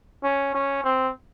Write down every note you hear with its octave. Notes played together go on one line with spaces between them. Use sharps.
C#4
C#4
C4